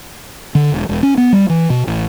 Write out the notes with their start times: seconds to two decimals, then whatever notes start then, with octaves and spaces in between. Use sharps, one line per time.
0.55 D3
0.72 E1
0.89 E1
1.03 C#4
1.18 B3
1.33 G3
1.49 E3
1.70 B2
1.87 A1